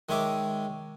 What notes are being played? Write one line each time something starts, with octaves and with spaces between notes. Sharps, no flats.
D#3 G#3 C#5 E5 D6